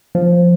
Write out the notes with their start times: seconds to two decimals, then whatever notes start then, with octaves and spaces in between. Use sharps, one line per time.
0.15 F3